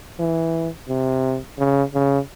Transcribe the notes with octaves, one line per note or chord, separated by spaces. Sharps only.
E3
C3
C#3
C#3